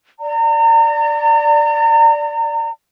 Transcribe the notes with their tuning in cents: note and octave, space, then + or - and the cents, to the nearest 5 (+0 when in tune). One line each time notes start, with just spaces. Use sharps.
D5 +0 A#5 -35